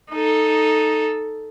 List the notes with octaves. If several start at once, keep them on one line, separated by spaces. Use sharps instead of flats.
D#4 A4